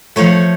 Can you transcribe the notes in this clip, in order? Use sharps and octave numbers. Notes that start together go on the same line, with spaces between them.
F3 A3 C#5